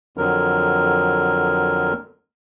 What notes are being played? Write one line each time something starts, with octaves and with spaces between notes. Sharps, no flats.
F2 D3 F#3 A#4